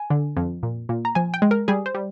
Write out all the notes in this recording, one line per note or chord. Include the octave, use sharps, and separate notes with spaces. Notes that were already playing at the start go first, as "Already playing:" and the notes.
Already playing: G#5
D3
F2
A#2
A#2
A#5
F3 G#5
G5
G#3
A#4
G3 G#4
C5
G3